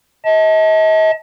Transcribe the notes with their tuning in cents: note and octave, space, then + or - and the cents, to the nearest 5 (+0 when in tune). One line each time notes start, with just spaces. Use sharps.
D#5 +40 A5 +0